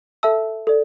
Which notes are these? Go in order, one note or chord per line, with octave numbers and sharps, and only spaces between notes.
A4 E5 A5 E6
A4 D5